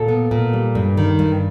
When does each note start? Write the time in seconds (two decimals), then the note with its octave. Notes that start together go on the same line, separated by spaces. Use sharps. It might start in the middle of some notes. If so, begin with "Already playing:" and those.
Already playing: A#2 A4
0.08 B3
0.31 A#2
0.53 G3
0.75 G2
0.97 D#3
1.19 G2